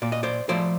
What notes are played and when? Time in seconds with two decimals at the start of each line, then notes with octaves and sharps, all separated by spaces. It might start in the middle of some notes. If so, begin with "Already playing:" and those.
0.02 A#2 D5
0.12 D#5
0.23 C5 D5
0.49 F3 A3 C5 D5